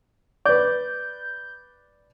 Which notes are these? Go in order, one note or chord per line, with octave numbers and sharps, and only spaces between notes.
B4 D5 G6